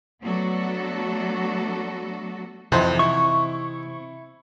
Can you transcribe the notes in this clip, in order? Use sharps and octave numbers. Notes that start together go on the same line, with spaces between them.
F#3 A3 B3 D4 F#4 A4
F2 C3 E3 D#4 C5 F#5
E4 C#6